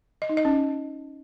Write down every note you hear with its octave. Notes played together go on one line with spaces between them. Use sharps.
D#5
D#4
D#5
C#4